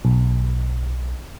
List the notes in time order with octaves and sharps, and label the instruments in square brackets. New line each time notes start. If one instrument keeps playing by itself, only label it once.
[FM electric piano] B1